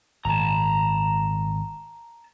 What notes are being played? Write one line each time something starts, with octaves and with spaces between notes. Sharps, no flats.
G#1 A#2 A5 A#5